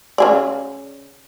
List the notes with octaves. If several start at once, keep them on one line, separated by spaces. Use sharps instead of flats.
C#3 G#4 D5